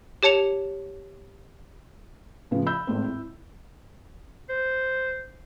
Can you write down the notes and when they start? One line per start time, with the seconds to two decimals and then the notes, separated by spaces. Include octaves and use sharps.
0.23 G4 C#5 A5 C#7 F7
2.51 A2 C#3 F3 B3
2.66 B5 E6 G6
2.87 G#1 A2 C4
3.04 E4
4.49 C5